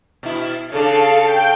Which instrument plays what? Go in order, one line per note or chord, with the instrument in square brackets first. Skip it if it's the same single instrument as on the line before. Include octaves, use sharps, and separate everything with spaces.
[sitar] B2 E4
[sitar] C#3 D4 [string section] A4 F5
[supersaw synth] G5